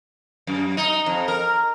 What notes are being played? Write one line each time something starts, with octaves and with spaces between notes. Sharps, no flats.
F#2
D#4
F2
A#4